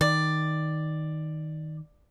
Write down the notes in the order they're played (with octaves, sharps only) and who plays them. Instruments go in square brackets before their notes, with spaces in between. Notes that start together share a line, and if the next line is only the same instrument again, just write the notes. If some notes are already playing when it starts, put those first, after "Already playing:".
[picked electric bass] D#3 [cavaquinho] D5